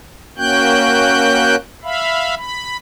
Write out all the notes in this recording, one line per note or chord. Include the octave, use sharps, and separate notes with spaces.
A#3 C#4 F#4 G5 F#6 G6
E5 F5 B5
B5